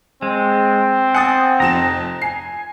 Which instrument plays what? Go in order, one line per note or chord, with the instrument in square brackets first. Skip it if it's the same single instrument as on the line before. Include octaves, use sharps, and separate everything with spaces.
[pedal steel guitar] G#3 [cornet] C4
[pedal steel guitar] F#5 [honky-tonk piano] G#5 D#6 A6
[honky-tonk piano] F1 F2 E7 [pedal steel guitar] A#5
[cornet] G#5 [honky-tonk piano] C7